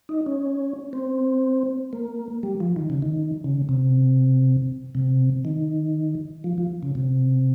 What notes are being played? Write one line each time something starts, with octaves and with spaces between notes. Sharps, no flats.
D#4
C#4
C4
A#3
G3
F3
D#3
C#3
D#3
C#3
C3
C3
D#3
F3
F3
C#3
C3